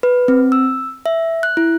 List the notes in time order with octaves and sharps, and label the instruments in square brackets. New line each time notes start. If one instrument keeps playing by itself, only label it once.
[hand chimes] B4
C4
E6
E5
F#6
E4